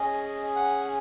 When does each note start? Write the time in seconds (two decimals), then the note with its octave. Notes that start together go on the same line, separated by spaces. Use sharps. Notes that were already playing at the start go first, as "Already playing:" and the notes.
Already playing: C#4 G#4 D#5
0.56 F#5